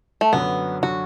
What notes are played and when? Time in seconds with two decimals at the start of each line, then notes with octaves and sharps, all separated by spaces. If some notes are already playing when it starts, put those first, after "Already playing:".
0.21 A3
0.33 F#2 D3 F#3 B3
0.82 D3 F#3 F#4